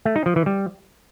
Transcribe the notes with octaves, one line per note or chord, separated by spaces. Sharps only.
A3
D#4
F3
E3
G3